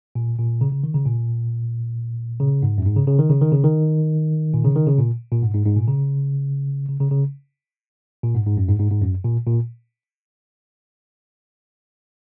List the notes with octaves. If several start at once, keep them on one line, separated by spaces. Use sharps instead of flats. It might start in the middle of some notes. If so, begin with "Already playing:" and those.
A#2
A#2
C#3
C#3
D#3
C#3
A#2
C#3
G#2
F#2
G#2
C#3
C#3
D#3
C#3
D#3
C#3
D#3
A#2
C#3
D#3
C#3
A#2
A#2
G#2
G#2
G#2
A#2
C#3
C#3
C#3
C#3
A#2
G#2
G#2
F#2
G#2
G#2
G#2
F#2
A#2
A#2